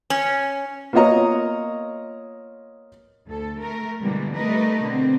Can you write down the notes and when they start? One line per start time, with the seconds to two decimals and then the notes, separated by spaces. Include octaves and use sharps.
0.10 C#4
0.93 A#3 B3 F4 C#5 D#5 A#5
3.26 D2 A4
3.58 A3 A#4
4.00 G2 B2 D3 E3 G3 G#3
4.36 G3 A3 D#4 A#4 B4 D#5
4.81 B2 D3 C4